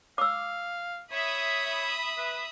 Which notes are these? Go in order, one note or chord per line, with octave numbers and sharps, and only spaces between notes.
F5 D6 E6
C#5 E5 B5 D#6
B4